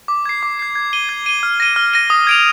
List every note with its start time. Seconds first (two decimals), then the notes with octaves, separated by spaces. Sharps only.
0.08 D6
0.26 G#6 C7
0.43 D6
0.59 G#6 C7
0.75 G#6
0.93 D#7 G7
1.09 G#6
1.26 D#7 G7
1.43 F6
1.60 A#6 D#7
1.76 F6
1.94 A#6 D#7
2.10 D#6
2.27 G#6 D7 F7